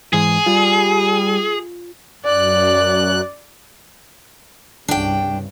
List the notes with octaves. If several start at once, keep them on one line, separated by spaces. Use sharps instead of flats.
G#2 E3 G#3 G#4
G3 F4
F#2 D5 F#6
C2 G2 C#3 D4 G5